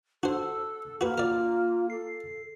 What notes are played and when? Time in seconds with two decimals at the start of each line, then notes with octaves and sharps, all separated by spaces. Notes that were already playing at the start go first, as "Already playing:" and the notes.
0.23 D4 F#4 A4 C5
1.01 A#3 F#4 B4
1.18 F4 A#4 D5
1.90 A4 C7